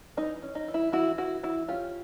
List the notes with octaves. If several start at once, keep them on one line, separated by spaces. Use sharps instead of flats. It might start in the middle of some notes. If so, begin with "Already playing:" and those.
E3 D#4
C#4
D#4
E3
E4
E3 E4 F#4
E3 E4 F#4
E3 E4 F#4
C#4 F4 G4